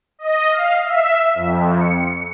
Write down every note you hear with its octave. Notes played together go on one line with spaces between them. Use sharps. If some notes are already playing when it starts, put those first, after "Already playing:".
D#5
F5
E5
F2
C#7